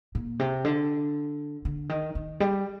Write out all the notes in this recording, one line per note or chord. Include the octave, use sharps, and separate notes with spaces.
A#2
C3
D3
D3
D#3
D#3
G3